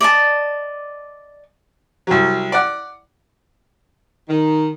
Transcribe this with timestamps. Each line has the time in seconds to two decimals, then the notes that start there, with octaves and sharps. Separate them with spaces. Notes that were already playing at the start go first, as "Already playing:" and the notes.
0.01 D5 D#5 A5
2.07 C2 F#3
2.52 D5 F#5
4.29 D#3